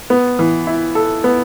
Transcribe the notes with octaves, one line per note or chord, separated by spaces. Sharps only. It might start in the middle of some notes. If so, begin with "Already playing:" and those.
B3
E3
E4
A4
B3